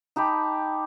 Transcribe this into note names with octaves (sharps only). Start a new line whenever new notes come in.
D#4 G4 A5 B5